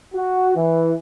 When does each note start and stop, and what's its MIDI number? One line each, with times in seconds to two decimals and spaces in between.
0.13 0.52 66
0.56 0.93 52